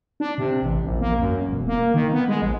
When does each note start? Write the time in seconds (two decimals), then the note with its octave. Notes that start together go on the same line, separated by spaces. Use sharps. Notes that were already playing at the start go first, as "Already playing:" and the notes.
0.20 D4
0.38 C3
0.62 A1
0.84 A#1
1.01 A#3
1.19 F#2
1.49 E1
1.68 A#3
1.94 D#3
2.13 B3
2.28 G#3
2.42 A#1